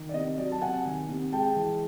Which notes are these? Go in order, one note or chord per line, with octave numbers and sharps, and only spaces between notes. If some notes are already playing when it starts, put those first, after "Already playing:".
Already playing: D#3
D5
C3 D#5
F#3 D5
A5
C3 F#5 G#5
D#3
C3
G#3 G5 A5
E3